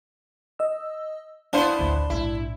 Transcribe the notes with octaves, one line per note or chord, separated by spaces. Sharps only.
D#5 E6
B3 D4 E4 C5 F5 C6
A1 D2
A#1 G#2 E4